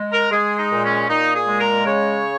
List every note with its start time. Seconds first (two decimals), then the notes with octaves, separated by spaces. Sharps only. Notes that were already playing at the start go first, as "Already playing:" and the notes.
Already playing: G#3
0.12 A#4
0.31 G#3 G#4
0.57 D#4
0.70 A#2
0.83 C#4
1.09 A#2 D#4
1.34 G#4
1.47 G#3
1.60 A#4
1.86 C#3 C#5